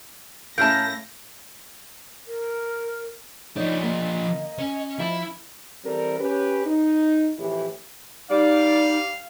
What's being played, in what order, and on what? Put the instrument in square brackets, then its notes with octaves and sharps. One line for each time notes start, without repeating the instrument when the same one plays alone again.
[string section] A2 A#6 [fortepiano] C#4 E4 F5 [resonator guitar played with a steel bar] A#4 A5 [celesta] G6
[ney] A#4
[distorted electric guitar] F3 D4 [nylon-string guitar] D#4 C#5 D#5
[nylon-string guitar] A#3 [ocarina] D#5
[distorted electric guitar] C#4
[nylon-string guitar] F3 A5 [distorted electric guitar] E4
[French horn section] E3 G3 C4 A4 A#4
C#4 G4 B4
D#4
F2 A2 E3 E4 G4
[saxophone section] G3 D5 [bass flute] D#4 [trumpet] F5